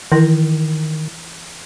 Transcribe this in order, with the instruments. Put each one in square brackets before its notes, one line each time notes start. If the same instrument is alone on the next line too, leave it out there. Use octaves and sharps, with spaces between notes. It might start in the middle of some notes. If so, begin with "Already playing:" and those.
[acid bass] D#3 [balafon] E3 E4 A#4